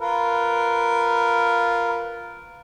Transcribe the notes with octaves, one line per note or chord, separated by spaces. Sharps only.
F4 A#4 B4